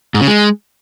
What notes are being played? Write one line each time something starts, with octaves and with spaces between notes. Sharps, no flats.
G#2
C#3
G#3